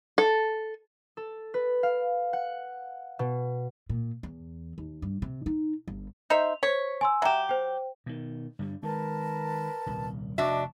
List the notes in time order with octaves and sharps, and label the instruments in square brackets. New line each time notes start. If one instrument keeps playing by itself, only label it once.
[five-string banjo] A4
[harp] A4
B4
F5
F#5
B2
[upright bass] A#2
E2
D#2
G2
C3
D#4
G1
[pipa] D#4 C5 E5 [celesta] F7
[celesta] C5 B6 [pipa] C#5
[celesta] G#5 C6 E6
[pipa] F#3 G4 [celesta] E5 A#5 E7
[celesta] C5 G5
[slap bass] B2 D#3
G2 D3 G3
[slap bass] D#3 G#3 [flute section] A#4 B4 A5
[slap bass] D#1 C2
[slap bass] F1 [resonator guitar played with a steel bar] D4 F#4 E5 [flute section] D#5 D6